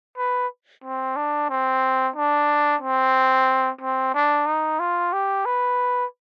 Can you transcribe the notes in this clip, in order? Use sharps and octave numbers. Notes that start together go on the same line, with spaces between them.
B4
C4
D4
C4
D4
C4
C4
D4
D#4
F4
G4
B4